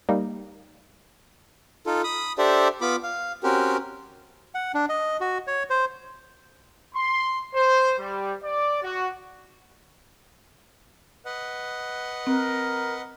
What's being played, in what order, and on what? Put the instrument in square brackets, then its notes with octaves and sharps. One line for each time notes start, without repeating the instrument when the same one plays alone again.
[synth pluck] G3 A#3 D#4
[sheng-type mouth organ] D#4 F4 A4
B5 D#6
D4 G4 A4 C5 D5 E5
B3 F4 B5 D6
F5
C4 C#4 F#4 G4 A#4
[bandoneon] F#5
D4
D#5
F#4
C#5
C5
[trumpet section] C6
C5
G3
D5
F#4
[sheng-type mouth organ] B4 D#5 F#5
[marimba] C4 [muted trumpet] A#4